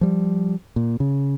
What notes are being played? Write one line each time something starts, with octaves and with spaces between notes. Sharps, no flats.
F3 G3
A#2
C#3